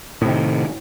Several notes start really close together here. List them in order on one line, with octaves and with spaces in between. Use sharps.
A2 C3 D#3